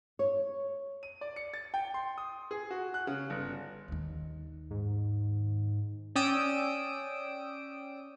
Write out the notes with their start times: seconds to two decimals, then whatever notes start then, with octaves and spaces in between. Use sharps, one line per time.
0.19 C#5
1.03 D#7
1.21 D5
1.36 C#7
1.54 A6
1.74 G5
1.94 C6
2.18 D#6
2.51 G#4
2.71 F#4
2.94 F#6
3.07 C#3
3.30 G1
3.88 D#2 D#3
4.71 G#2
6.15 C#4 D5 G5 D#6 E6 D7